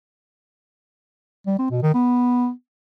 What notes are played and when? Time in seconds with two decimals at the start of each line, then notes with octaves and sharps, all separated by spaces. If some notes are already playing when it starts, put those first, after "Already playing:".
1.47 G3
1.59 C4
1.71 B2
1.83 D#3
1.94 B3